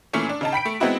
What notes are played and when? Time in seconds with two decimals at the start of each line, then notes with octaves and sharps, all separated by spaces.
0.13 A#2 E3 A3 C#4
0.29 D4
0.41 C#3 D#4 A5
0.53 G5 B5 B6 D7
0.65 A3
0.80 G#3 B3 C4 D#4 E4 F#4